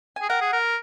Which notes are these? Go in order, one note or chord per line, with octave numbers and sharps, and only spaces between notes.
G#5
G#4
A#4 F#5
G#4
A#4